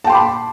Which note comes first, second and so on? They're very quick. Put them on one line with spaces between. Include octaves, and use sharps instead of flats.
A5 G5 C6 D6 B5